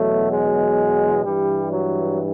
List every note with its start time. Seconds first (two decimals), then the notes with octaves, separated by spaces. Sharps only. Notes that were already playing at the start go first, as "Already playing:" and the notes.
Already playing: E2 B2 F#3 A3
0.30 G#3
1.23 G2 E3 G3
1.71 F#3